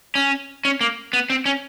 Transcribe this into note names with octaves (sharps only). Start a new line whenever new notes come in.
C#4
C#4
A#3
B3
C4
C#4